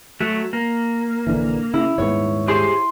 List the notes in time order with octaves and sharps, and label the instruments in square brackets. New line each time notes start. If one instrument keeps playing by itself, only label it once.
[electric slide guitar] F#3 A3
A#3
[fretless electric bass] A#1 D3 E3
[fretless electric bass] C#3 [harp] E4
[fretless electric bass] D#1 G#2 B3 [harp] C#5
[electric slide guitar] G4 G#4 C5 [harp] C6